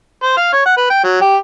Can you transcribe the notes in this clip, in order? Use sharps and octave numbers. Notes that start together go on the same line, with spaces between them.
C5
F5
C#5
F#5
B4
G5
F#3
G4